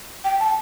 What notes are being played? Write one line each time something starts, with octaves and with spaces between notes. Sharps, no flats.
G5
A5